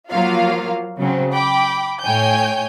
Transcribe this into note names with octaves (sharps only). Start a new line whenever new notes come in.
F3 F#3 A#3 F4 F5
C#3 F#3 C4
G5 B5 D6
A2 C#5 G5 G#5 G6